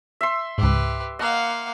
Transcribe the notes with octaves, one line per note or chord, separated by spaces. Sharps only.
E5 C6
C#2 G#2 G4 B4
A#3 D#5 F5 F#5